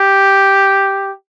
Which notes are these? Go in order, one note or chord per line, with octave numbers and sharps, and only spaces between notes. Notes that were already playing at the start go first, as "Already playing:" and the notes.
Already playing: G4